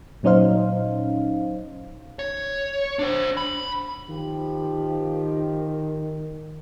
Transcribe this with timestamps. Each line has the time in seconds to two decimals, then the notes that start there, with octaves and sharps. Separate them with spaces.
0.23 A#2 F#3 C#4 D#4 C5 F5
2.19 C#5
2.99 D4 C5
3.37 B5
4.09 D#3 F3 G4